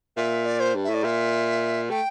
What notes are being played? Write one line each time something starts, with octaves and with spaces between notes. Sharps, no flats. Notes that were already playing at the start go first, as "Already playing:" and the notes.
A#2 E5
D5
C5
G2
E5
A2
D5
A#2 E5
A3 G5